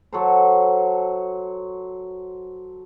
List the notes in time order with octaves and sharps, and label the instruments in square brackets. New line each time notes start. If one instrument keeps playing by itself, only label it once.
[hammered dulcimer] F#3 A4 C5